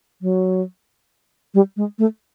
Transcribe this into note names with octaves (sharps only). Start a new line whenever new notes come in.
F#3
G3
G#3
A3